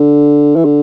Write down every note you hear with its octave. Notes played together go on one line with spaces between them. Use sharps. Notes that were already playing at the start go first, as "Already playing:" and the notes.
Already playing: D3
E3
D3